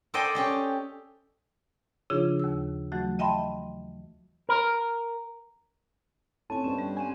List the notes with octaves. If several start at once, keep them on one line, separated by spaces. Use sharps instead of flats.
A4 C5 D5 D#5 G5 G#5
C#4 G4 D#5
C#3 F3 D4 D#4 F4 G#4
D#2 E6
E3 F#3 A3 F#4
D#5 E5 G5 A5 B5 C6
A#4
A2 C4 C#4 D#4 A4 C#5 G#5 A5
G2 B3 C#4 B4 C5
G3
C4 C#4 F#5 G#5